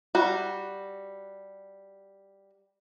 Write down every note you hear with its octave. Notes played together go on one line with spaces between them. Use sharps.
G3 F#4